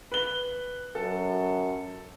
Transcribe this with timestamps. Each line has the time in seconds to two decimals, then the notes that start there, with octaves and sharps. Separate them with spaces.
0.12 B4 G7
0.95 F#2 A4